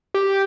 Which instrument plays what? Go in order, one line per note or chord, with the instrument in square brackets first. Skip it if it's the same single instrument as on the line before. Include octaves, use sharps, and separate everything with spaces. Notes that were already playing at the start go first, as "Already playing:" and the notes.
[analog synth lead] G4